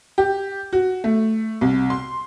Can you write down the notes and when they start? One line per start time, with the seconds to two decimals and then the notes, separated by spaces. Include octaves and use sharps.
0.18 G4
0.73 F#4
1.04 A3
1.61 C2
1.90 C6